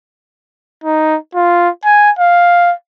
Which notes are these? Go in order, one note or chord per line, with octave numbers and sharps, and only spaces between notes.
D#4
F4
G#5
F5